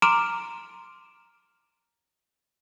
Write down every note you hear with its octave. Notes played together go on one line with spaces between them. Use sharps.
A#5 C6 D6 F6 D7 E7